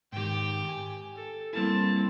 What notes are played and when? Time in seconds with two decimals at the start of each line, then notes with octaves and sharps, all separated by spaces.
0.13 G#2 D#3 G4 G5
0.69 G#5
1.15 A4
1.53 G3 A#3 C4 E4 A5